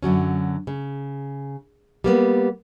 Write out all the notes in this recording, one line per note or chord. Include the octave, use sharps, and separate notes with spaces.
F#2 D3 F#3 C#4
C#3
G3 A#3 B3